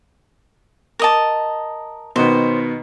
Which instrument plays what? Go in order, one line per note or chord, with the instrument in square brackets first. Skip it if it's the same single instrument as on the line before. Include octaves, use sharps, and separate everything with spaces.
[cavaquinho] A#4 D#5 A5
[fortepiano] B2 D#3 B3 [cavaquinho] C5